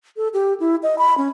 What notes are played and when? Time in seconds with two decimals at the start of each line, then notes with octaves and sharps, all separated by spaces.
0.17 A4
0.34 G4
0.60 E4
0.83 D#5
0.98 B5
1.18 C#4